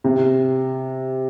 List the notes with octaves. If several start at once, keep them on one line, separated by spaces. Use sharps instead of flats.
C3